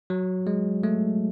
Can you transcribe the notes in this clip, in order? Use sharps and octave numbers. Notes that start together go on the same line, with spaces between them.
F#3
G#3
A3